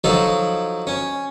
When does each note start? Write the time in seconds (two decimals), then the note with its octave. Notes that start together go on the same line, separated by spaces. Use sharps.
0.04 F3 F#3 D#4 A4
0.87 C#4